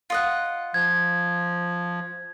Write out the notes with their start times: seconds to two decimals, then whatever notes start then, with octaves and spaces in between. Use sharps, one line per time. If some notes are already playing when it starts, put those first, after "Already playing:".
0.10 F4 D#5 F#5
0.74 F3 G#6